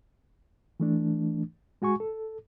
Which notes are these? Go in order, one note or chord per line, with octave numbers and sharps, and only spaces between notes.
E3 A3 D4
G#3 F#4 G#5 C#6
A4